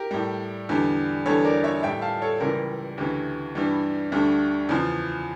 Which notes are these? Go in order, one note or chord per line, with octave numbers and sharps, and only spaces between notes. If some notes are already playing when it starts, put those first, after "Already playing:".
Already playing: G4 A#4
A2 G3
E2 D3 G3
E2 D3 G3 A4 C#5
A#4 D5
C#5 E5
A2 G3 E5 G5
F5 A5
A4 C#5
C#2 C#3 E3 G3 G4 A#4
D2 C#3 E3 G4
G2 E3 G3
D2 D3 G3
E2 C#3 F3